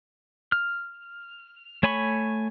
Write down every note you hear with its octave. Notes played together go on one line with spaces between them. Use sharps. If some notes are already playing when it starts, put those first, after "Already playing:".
F6
A3 C#5 G#5 B5 C#6